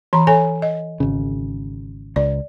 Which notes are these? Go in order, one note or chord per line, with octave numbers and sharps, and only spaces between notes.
E3 A#5 B5
A4 C#5 G#5
D#5
G#1 C#3
C#2 D5